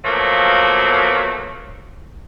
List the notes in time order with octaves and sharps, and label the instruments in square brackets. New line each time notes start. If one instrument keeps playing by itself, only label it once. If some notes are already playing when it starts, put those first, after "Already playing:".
[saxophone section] B2 F3 F#3 A3 A#3